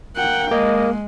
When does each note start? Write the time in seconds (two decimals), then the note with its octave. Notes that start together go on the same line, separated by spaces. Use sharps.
0.16 A#3 F#5 G5
0.51 G#3 A#3 D#5